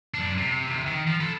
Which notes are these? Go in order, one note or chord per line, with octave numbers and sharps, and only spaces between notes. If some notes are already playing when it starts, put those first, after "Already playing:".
F#2 D4
C3
D2 C3
D#3
F3
A4 B4